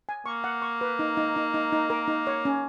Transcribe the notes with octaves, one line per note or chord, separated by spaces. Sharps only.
G#5
A#3 C#6
F#5
C#6
B4
D#4
D#4
D#4
D#4
D#4
A#4
D#4
C#5
C#4